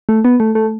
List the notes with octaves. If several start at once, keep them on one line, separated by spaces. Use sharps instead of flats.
A3
B3
A3
A3